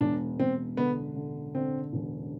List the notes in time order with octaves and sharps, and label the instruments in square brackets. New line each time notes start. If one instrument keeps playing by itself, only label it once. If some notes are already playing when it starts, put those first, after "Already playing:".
[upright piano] E1 [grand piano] D4
[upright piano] E1 [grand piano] C4
[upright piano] D3 [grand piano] B3
[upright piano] D3
[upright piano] D3 [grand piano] C4
[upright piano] E1